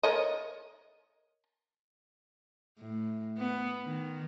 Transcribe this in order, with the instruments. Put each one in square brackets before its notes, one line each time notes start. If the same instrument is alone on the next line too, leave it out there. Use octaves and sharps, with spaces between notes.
[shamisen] A#4 C#5 D#5
[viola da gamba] A2
B3
D#3